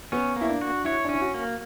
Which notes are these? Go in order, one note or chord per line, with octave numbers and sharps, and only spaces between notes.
B3 C#4
A#3 E4
D4
F#4
E4 C#5
D4
C#4 E4
F#4
A#3